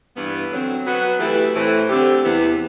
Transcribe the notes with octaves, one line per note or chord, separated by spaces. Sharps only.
G2 E3 B3
D3 F#3 C4
F#3 B3 F#4 B4
E3 A3 E4 G4 B4
A2 E3 A3 C4
D3 A3 C4 G4
E2 C3 E3 B3